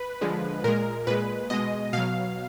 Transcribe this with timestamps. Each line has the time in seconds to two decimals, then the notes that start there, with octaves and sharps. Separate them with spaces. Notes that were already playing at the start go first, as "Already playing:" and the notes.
Already playing: B4
0.21 D3 F3 G#3
0.64 A#2 G#3 A#4
1.07 A#2 G#3 B4
1.50 B2 G#3 D#5
1.93 B2 F#3 F5